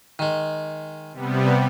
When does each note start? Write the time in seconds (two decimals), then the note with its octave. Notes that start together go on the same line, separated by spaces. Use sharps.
0.19 D#3 G#3
1.12 C3 G3 B3